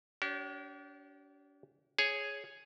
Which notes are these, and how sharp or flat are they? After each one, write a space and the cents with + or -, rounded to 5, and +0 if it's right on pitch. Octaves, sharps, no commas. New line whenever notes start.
D4 -40 G4 -40 C#5 +0
G#4 +0 C#5 +0